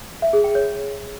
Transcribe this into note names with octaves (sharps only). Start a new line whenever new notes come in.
E5
G#4
G5
C#5